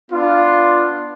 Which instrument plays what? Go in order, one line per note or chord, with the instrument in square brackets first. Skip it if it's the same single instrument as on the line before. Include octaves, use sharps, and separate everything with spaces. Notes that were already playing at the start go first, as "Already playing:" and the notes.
[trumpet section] B3 D4 F4